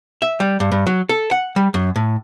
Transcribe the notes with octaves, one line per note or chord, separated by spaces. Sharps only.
E5
G3
G2
G2
F#3
A4
F#5
G3
F#2
A2